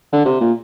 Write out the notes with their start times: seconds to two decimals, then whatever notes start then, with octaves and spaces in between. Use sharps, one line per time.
0.12 D3
0.25 C3
0.40 A#2